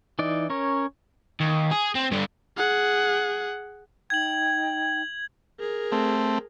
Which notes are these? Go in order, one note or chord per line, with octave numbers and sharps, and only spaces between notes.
E3 D#4 D5
C#4 A#4 C#5
D#2
G#4
C4
G2 D3
G#4 F#5
D#4 G5 G#6 F#7
G#4 A#4
A3 C4